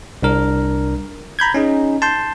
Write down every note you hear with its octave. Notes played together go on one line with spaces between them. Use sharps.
C2 D4 A#4
A#5 B5 G6 G#6
C#4 D#4 G#4
A5 C6 G6